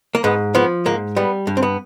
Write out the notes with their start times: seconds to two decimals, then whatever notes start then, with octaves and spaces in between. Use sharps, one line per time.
0.15 A#3
0.24 G#2 B3
0.55 F3 B3
0.85 G#2 A#3
1.16 G3 B3
1.47 G2
1.57 C4
1.63 B3